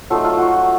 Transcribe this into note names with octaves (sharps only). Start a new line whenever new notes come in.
F#3 A3 D#4 F4 A4
F4 A4
F#4